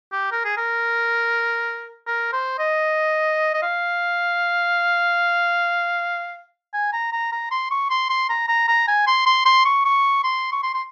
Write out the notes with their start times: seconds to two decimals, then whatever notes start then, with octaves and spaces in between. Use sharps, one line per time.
0.12 G4
0.32 A#4
0.45 G#4
0.57 A#4
2.07 A#4
2.33 C5
2.59 D#5
3.54 D#5
3.63 F5
6.74 G#5
6.93 A#5
7.13 A#5
7.32 A#5
7.52 C6
7.71 C#6
7.90 C6
8.10 C6
8.29 A#5
8.48 A#5
8.68 A#5
8.88 G#5
9.07 C6
9.26 C6
9.46 C6
9.65 C#6
9.85 C#6
10.24 C6
10.52 C#6
10.63 C6
10.74 C6